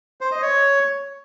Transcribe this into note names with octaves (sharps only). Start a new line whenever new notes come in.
C5
D#5
C#5